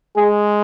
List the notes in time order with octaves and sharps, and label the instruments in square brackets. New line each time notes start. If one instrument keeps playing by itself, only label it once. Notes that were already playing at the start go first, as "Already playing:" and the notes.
[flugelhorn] G#3 [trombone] G#4